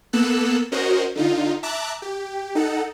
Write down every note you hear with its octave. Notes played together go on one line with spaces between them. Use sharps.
A#3 B3 A4 E6 F#6
C#4 F#4 A#4 C5 D#5
D3 D#4 F4
E5 A5 A#5 D6 F#6
G4
D#4 A4 F#5